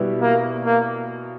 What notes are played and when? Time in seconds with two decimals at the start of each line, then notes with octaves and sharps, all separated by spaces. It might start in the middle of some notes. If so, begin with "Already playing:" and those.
Already playing: B2 G3 B3 E4
0.21 A#3
0.65 A#3